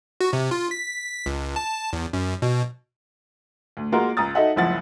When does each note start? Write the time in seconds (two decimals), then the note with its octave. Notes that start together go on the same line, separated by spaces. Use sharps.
0.21 F#4
0.33 C3
0.51 F4
0.71 B6
1.26 C#2
1.56 A5
1.93 E2
2.13 F#2
2.42 B2
3.77 D2
3.92 G#3 A#3 F4 F#4 A#4
4.17 C#2 A#5 D#6 A6
4.35 D#4 F#4 A4 D#5 E5 F#5
4.56 F#1 C#2 F3 E4 F#5 A6